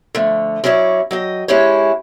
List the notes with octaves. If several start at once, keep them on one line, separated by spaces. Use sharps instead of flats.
D3 F3 A3
F#3 C#4 E4 A#4 C#5 D5
F#3 D#5 G5
G#3 C#4 E4 G4 C#5